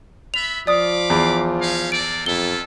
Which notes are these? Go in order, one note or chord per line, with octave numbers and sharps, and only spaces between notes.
B3 E5 B5 F7
F3 D5 F5 B5 D6 D#6
E2
C#4 D#4 F5
A#3 A4 D5 D7
F2 E4 F4 A4 G7